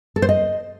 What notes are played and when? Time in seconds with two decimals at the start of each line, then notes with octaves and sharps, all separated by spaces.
0.16 A4
0.22 C5
0.29 D#5